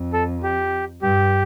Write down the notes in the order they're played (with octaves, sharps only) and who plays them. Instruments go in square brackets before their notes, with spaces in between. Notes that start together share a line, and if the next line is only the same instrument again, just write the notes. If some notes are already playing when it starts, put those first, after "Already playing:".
Already playing: [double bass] F2
[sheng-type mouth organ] A4
G4
[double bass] G2 [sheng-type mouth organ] G4